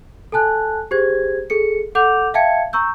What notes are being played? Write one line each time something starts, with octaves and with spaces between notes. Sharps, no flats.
A4 G#5 A5 F#6
G4 G#4 C5 G#6
G#4 A4 C#7
A4 F#5 D6 G6 F7
E5 F5 G5 A5 G#6 C#7
A#5 C#6 E6 G6